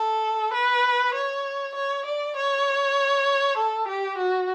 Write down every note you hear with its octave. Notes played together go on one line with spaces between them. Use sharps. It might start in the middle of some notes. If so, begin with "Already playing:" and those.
Already playing: A4
B4
C#5
C#5
D5
C#5
A4
G4
F#4